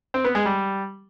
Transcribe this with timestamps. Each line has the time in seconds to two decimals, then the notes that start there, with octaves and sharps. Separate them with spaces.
0.14 C4
0.25 B3
0.35 G#3
0.45 G3